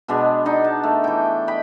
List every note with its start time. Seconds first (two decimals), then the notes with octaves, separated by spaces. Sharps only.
0.08 B2 G#3 B3 D4
0.46 D4 D#4
0.64 A5
0.84 A3
1.04 E3 G5
1.47 D#5 G5 B5